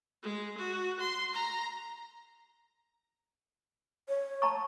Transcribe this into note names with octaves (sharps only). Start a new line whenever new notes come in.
G#3
F#4
C6
A#5
C#5
A5 A#5 C#6